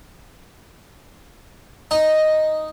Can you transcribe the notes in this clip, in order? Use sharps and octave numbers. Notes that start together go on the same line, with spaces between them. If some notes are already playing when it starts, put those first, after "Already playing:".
D#4